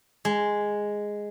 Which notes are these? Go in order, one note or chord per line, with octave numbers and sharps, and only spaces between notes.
G#3